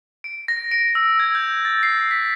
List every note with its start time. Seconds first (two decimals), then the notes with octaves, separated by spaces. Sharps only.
0.24 D7
0.48 A#6
0.71 D7
0.95 E6
1.20 G#6
1.35 G6
1.65 A6
1.83 C7
2.11 B6